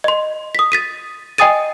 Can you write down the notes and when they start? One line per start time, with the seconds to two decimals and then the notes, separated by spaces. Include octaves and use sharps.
0.04 D#5 C6
0.55 D#6 B6
0.72 A6 B6 D#7
1.38 D#5 G5 G#5 D#6 A6 D#7